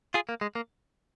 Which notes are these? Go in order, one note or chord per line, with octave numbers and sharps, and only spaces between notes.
F4 G#4
A#3
G#3
A#3